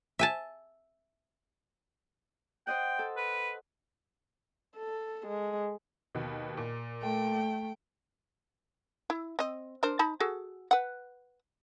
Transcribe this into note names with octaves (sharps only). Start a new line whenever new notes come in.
E5 G#5 A5
C5 D#5 F#5 G5
A4
B4
A4
G#3
D#2 B2
A#2
A3 G5
E4
C4 D#5
D4 A#4 C5
D#4 A5 B5
F#4 G#4 A4
B4 F#5